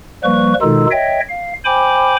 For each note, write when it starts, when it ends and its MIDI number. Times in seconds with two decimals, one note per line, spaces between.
0.24 0.54 53
0.24 0.54 55
0.24 0.54 58
0.24 0.54 71
0.24 0.54 85
0.62 0.86 47
0.62 0.86 51
0.62 0.86 56
0.62 0.86 63
0.62 0.86 65
0.62 0.86 69
0.91 1.20 73
0.91 1.20 75
0.91 1.20 76
0.91 1.20 79
1.29 1.53 77
1.65 2.16 72
1.65 2.16 79
1.65 2.16 80
1.65 2.16 83
1.65 2.16 86